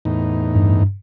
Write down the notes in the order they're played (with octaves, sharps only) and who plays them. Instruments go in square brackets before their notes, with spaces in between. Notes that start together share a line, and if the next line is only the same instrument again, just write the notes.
[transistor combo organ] E2 A2 D#4
[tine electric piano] G2